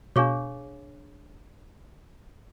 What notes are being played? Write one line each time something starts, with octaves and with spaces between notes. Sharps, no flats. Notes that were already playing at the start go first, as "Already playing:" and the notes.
B2 D4 G#4 C#5 F5 C#6 D6